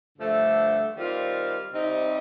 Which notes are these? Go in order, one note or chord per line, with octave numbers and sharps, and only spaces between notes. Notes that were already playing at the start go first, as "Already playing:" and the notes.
G2 D3 F3 A3
D#3 G3 C4 F4
C3 G3 C4 D#4